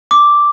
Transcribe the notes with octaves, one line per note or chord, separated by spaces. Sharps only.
D6